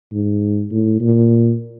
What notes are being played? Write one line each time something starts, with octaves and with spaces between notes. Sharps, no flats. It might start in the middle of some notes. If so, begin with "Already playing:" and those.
G#2
A2
A#2